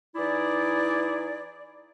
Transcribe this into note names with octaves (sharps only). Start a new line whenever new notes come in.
E3 D#4 E4 G#4 D5